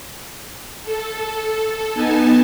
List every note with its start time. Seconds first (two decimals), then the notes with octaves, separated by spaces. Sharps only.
0.83 A4
1.94 B3 D#4 G#5 A5